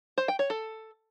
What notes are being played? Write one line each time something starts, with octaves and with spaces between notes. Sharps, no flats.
C5
G5
C#5
A4